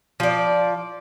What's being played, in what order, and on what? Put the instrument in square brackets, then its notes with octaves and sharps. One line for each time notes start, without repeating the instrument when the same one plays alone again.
[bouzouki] F3 D5